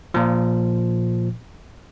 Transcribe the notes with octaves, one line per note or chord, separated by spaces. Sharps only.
A#2 F3